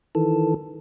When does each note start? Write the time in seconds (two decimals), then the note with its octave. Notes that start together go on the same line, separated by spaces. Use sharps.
0.15 D#3 E3 A4